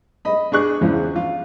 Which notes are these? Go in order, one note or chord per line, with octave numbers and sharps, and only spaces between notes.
D#5 B5
D4 G#4 C#6 F#6
E2 C#3 E3 F3
F4